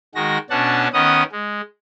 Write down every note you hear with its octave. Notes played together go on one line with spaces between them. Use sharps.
D#3 G#3 F#4 A#6
B2 C#4 D4 F#5 A5
D#3 B3 C#4 D#5 F#5 D#6
G#3